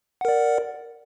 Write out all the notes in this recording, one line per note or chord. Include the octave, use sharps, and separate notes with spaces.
A#4 D5 F#5